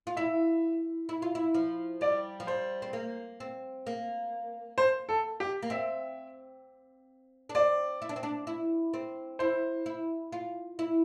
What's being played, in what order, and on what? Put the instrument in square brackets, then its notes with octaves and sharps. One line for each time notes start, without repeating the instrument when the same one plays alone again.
[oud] F4
[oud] E4 [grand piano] E5
[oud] E4
F4
E4
F3
[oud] G3 [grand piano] D5
[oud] F3
[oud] G3 [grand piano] C5
[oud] C4
A#3
C4
A#3
[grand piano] C5
A4
G4
[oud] A#3
[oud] C4 [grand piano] E5
[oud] D4
[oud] C4 [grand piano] D5
[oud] E4
D4
C4
D4
E4
C4
[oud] E4 [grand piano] C5
[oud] E4
F4
E4